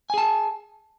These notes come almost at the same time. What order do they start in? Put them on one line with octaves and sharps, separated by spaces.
G#5 G#4 A5